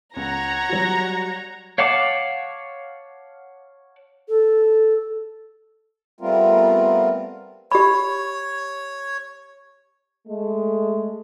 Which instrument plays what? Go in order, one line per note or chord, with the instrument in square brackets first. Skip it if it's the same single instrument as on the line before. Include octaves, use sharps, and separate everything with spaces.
[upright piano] C#2 [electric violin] C#5 F#5 [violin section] A#5
[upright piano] F#3 G3 F#4
[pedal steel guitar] C#5 F5 F#5 A5 D6
[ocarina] A4
[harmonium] G3 A3 B3 C4 F4 A#4
[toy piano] G4 B5 [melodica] C#5
[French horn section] G#3 A3